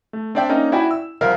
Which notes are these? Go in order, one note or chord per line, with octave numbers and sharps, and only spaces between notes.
A3
C4 D4 D5 E5 G5
A#3 C#4 D#4
E4 F#4 D5 E5 G5 G#5
E6
C2 F3 A#4 C5 E5 F5